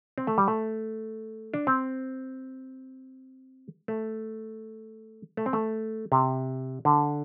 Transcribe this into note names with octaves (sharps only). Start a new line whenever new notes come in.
C4
A3
G3
A3
D4
C4
A3
A3
C4
A3
C3
D3